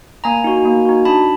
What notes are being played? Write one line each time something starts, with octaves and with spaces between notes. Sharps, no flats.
A#3 G#5 A#5
D#4 F#4
A#3
D#4 F#4
D4 A5 B5